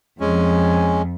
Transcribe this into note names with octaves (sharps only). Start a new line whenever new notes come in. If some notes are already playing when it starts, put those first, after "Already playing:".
F2 G#3 C#4